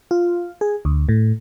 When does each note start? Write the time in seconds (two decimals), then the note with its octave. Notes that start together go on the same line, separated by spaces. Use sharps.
0.11 F4
0.61 G#4
0.85 D2
1.09 A2